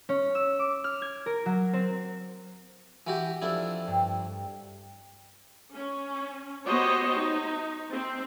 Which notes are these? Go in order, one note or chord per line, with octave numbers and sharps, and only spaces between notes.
C#4
E6
D6
F6
G#6
A#4
F#3
C4
E3 F#4 G4
F2 D4 E4
G2
C#4
B3 F#4 G4 C5 C#5 D#5
D#4
C4